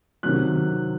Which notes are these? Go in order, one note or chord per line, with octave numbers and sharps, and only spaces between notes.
C3 D#3 F#3 F#6